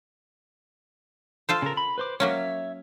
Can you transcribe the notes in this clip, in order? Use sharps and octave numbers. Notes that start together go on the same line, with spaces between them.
F4 A4 C5
C#3 A#4
B5
B4 C5 D6
F#3 A#3 C#4 C#5 E5